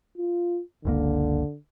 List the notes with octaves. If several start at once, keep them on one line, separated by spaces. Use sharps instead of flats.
F4
F#1 C#2 D3 A#3